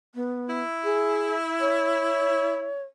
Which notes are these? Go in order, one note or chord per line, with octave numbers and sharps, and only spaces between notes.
B3
E4
G#4
C#5